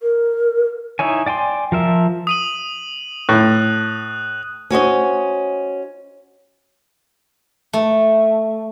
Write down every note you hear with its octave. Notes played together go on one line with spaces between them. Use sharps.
A#4
D#4 E4 C#5 G#5
D5 G5 G#5 C6
F3 A#4 E5
D#6 D#7 F#7
A2 F#6
C#4 F#4 C5 D#5
A3